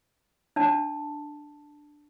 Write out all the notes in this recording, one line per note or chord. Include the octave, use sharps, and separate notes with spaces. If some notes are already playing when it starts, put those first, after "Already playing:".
D4 A5